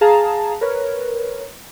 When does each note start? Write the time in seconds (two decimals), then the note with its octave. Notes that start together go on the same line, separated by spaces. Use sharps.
0.01 G#4 F5 A5 A#5
0.61 A#4 B4 C#5